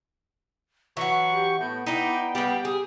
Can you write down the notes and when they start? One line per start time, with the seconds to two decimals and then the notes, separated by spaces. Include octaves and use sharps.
0.97 E3 F#3 F#4 C#6
1.30 G4
1.61 A2 B3 G6
1.86 B3 D#4 E4 D5 G5
2.35 C#3 G3 B3 G4
2.65 G4 G#4 D#6